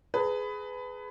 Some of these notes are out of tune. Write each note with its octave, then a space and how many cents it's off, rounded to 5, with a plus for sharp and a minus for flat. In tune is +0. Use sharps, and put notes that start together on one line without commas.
G#4 +10 B4 +20 A#5 -40